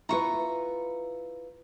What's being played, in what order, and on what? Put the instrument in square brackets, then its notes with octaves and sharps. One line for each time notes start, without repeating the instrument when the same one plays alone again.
[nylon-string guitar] E4 F4 B4 [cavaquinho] A#5 C#6